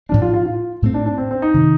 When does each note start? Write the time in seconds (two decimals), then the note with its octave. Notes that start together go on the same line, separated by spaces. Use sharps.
0.09 A2 F3 C4 D4
0.22 F4
0.34 F4
0.46 F4
0.82 A2 A3 C4
0.94 D4
1.06 D4
1.18 C4
1.31 C4
1.42 D#4
1.54 C3 D#3